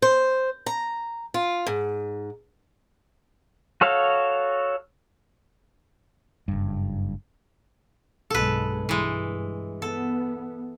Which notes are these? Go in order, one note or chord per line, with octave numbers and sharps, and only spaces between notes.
C5
A#5
F4
G#2
F#4 A4 C#5 F5
F#1 G2
B1 G2 G#3 A4 B4
G2 E3 G#3
B3 A4